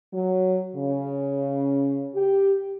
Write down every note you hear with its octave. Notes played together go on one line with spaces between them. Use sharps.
F#3
C#3
G4